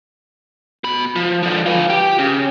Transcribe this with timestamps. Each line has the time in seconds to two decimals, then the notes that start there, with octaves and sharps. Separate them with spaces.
0.84 B2 B5
1.16 F3
1.43 D3 F3
1.66 F4 B4
1.90 G4
2.19 C#3